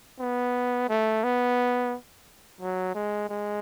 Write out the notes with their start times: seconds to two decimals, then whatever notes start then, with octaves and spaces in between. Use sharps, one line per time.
0.20 B3
0.89 A3
1.24 B3
2.61 F#3
2.95 G#3
3.29 G#3